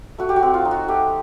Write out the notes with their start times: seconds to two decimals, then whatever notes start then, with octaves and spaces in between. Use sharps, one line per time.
0.18 A3 F#4
0.29 G4
0.36 F#4
0.43 C4
0.54 F4
0.65 D#4
0.71 F#4
0.88 A3 G4